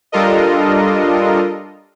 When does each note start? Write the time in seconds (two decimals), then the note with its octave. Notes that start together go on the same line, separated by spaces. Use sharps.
0.12 G3 D4 F4 A4 A#4 D#5